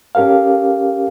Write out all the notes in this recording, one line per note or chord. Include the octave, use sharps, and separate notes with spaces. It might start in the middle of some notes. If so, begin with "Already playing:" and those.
C#4 G4 A4 A#4 F5